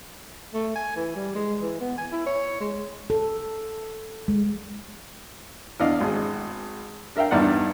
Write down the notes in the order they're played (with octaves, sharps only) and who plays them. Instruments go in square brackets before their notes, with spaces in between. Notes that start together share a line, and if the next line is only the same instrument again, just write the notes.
[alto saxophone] A3
G#5
E3
G3
G#3
E3
B3
G#5
E4
C#5
G#3
[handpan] A4
G#3
[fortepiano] E2 D4 D#5 F5
G#1 G#4
D4 A#4 E5 F5 G5
E2 G2 D#4 D5 F#5